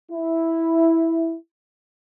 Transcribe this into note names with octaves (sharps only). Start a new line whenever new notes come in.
E4